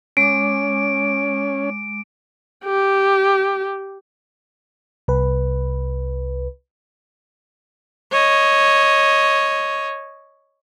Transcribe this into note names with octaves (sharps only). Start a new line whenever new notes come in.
G#3 C#4 D6 D7
G4
C2 B4
C#5 D#5